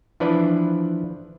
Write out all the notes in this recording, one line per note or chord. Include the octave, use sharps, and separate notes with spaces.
E3 F3 D4 E4 B4 D5